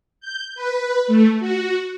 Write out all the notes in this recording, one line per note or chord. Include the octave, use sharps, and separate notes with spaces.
G6
B4
A3
F#4